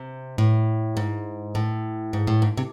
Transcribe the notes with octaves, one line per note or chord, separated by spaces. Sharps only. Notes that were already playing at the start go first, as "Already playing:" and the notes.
Already playing: C3
A2
G#2
A2
G#2
A2
G#2
C3